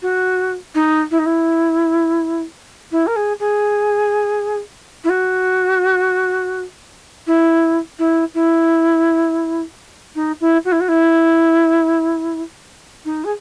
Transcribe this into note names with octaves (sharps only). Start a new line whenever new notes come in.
F#4
D#4
E4
D#4
E4
E4
A#4
G#4
G#4
E4
F#4
E4
E4
E4
D#4
E4
F#4
E4
F#4
E4
D#4
G#4